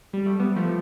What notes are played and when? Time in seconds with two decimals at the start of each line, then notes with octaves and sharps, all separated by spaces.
0.13 G3
0.26 A3
0.40 G3 B3
0.56 F3 A3